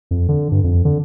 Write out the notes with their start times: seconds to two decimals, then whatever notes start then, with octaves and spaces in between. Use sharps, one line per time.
0.11 F2
0.29 D3
0.52 G2
0.64 F2
0.85 D3